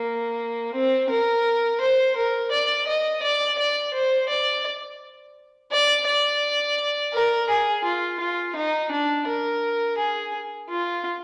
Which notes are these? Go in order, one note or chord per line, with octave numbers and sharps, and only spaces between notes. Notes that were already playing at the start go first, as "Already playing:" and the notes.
Already playing: A#3
C4
A#4
C5
A#4
D5
D#5
D5
D5
C5
D5
D5
D5
A#4
G#4
F4
F4
D#4
D4
A#4
G#4
F4